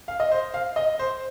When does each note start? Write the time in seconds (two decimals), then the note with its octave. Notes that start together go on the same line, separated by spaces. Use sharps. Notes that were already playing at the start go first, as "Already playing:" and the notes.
0.08 F5
0.20 D#5
0.32 C5
0.54 F5
0.76 D#5
0.99 C5